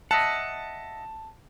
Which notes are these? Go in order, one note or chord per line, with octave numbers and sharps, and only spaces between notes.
D#5 E5 F#5 A5